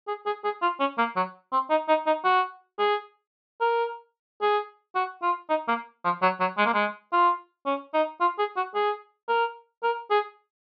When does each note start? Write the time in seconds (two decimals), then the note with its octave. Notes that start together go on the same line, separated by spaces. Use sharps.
0.07 G#4
0.26 G#4
0.44 G#4
0.62 F4
0.80 C#4
0.98 A#3
1.16 F#3
1.52 C4
1.70 D#4
1.88 D#4
2.06 D#4
2.25 F#4
2.79 G#4
3.61 A#4
4.42 G#4
4.95 F#4
5.22 F4
5.50 D#4
5.68 A#3
6.04 F3
6.22 F#3
6.40 F#3
6.58 G#3
6.66 A#3
6.74 G#3
7.13 F4
7.66 C#4
7.94 D#4
8.21 F4
8.39 G#4
8.57 F#4
8.75 G#4
9.29 A#4
9.83 A#4
10.11 G#4